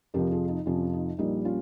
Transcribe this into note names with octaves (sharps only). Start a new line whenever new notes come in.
F2 C3 F3 G4 A#4
F4 G#4
D#4
F2 C3 F3 C#4 F4
D#4
A#1 A#2 G3 A#3 D#4
C#4 F4